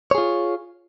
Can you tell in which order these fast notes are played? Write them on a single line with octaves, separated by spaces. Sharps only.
C#5 G#4 F4